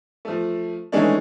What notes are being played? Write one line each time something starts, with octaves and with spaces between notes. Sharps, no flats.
F3 A3
D#3 E3 G#3 A3 C#4 D4